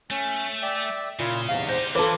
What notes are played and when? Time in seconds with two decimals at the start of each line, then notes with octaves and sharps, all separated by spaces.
0.10 A3 C#4
0.62 D5 E5 G5
1.19 A#2 C#3 E4 F4
1.49 E2 G#2 C3 F5
1.69 D#4 G4 C5
1.95 E3 F4 A4 B4 D6